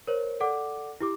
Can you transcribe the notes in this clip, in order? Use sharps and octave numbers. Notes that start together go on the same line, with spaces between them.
A#4 C5 C#5
A4 D5 F#5 D6
E4 G4 D6